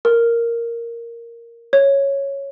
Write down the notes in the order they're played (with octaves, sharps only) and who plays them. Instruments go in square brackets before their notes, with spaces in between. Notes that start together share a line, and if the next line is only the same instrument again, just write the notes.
[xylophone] A#4
C#5